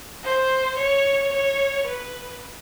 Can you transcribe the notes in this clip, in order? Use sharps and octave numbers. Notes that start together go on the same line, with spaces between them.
C5
C#5
C#5
B4